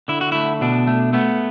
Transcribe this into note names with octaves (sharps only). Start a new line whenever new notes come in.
D3 E4
F#4
A3 E4
B2 D4
A3
A3 B3